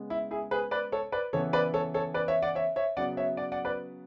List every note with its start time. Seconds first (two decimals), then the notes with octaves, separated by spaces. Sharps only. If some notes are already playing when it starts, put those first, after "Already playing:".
Already playing: C#3 G#3 B3
0.10 E4
0.31 E4 G#4
0.51 G#4 B4
0.71 B4 D5
0.92 A4 C#5
1.12 B4 D5
1.33 C#3 E3 B3 A4 C#5
1.53 B4 D5
1.74 A4 C#5
1.94 A4 C#5
2.14 B4 D5
2.28 C#5 E5
2.42 D5 F#5
2.55 C#5 E5
2.76 C#5 E5
2.97 C#3 F#3 B3 D5 F#5
3.17 C#5 E5
3.37 D5 F#5
3.52 D5 F#5
3.65 B4 D5